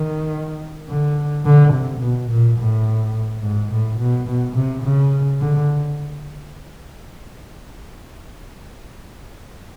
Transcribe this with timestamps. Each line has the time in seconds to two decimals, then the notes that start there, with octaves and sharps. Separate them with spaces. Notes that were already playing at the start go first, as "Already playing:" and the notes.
Already playing: D#3
0.89 D3
1.45 D3
1.73 C3
2.01 B2
2.30 A#2
2.58 A2
3.42 G#2
3.71 A2
3.99 B2
4.28 B2
4.56 C3
4.83 C#3
5.40 D3